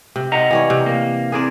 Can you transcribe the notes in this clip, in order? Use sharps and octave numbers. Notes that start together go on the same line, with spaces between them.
C3
D#5 F#5 A#5
E3 G3 C#5
C3
A#3
C2 C3 G#4 A#4 D5